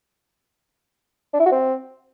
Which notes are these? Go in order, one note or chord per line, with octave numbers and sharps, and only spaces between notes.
D4
E4
F#4
C4